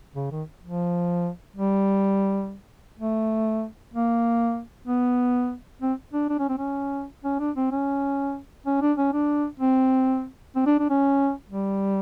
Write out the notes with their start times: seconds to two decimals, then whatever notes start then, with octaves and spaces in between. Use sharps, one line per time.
0.16 C#3
0.32 D#3
0.63 F3
1.57 G3
2.99 A3
3.94 A#3
4.87 B3
5.82 C4
6.14 D4
6.30 D4
6.39 C#4
6.49 C4
6.58 C#4
7.24 C#4
7.40 D4
7.56 C4
7.72 C#4
8.66 C#4
8.82 D4
8.98 C#4
9.13 D4
9.60 C4
10.56 C4
10.66 D4
10.79 D4
10.90 C#4
11.49 G3